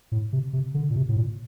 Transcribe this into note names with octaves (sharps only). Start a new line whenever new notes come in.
A2
C3
C3
D3
A#2
C3
A2
A#2